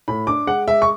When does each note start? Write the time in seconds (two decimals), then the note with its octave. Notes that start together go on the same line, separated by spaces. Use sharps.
0.08 A2 B5
0.27 D4 D6
0.47 G#3 F#5
0.68 G#3 E5
0.82 C#6